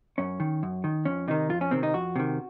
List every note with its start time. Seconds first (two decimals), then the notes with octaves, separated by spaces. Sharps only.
0.18 F#2 C#4
0.40 D#3
0.63 F#2
0.84 D#3
1.05 F2 C#4
1.28 C3 D#3 D#4
1.49 F2 F4
1.61 C#4
1.71 C3 D#3 C4
1.83 D#4
1.94 F2 F#4
2.16 C3 D#3